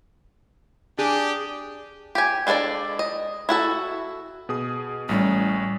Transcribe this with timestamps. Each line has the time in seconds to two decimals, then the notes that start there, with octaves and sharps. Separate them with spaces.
0.99 D4 G4 G#4
2.15 G4 G#5
2.47 G#3 D4 A4 B4 D5
2.99 D#5
3.49 E4 F#4 A4
4.49 B2 G#4 D#6
5.09 A1 A2 G3 C#4